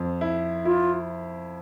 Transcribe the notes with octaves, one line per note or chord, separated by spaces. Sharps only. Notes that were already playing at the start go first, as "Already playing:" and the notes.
Already playing: F2
E4
E4 F4